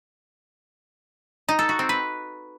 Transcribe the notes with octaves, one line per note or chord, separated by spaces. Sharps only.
D#4
A4
F#4
C4
B4